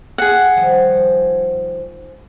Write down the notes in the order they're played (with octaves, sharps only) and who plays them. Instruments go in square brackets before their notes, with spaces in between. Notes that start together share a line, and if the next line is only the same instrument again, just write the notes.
[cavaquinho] G#4 F#5
[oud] D#3 F3 G3